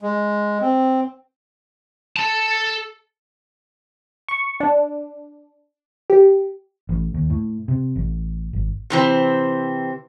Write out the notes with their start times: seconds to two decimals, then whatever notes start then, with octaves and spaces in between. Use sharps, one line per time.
0.02 G#3
0.61 C4
2.16 A4 A5
4.28 C#6
4.60 D4
6.10 G4
6.89 A1
7.14 D#2
7.30 A2
7.68 C3
7.96 A1
8.53 G#1
8.90 C3 E3 C4